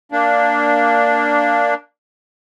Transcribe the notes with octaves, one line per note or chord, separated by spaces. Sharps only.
A#3 D4